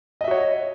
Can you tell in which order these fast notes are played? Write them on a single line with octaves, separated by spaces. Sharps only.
D#5 E5 F#4 C#5